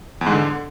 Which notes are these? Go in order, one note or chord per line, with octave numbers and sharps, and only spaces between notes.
E2
G#2
D3